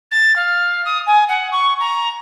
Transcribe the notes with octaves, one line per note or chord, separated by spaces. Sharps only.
A6
F5
D#6
G#5
F#5
C#6
A#5